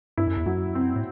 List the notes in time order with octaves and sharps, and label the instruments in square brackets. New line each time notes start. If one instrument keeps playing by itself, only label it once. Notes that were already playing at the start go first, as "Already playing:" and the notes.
[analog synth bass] G2 [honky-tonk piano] E4
[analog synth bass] F#2
E2
[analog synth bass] F#2 [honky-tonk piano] F#3
[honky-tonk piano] C4
[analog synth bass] A2